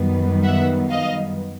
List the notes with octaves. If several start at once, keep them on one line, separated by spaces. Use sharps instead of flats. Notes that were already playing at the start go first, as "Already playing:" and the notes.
Already playing: F#2 D#3 G3 B3
E5 F#5
D#5 F5